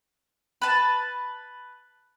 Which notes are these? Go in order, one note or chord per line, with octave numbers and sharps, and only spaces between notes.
B4 A5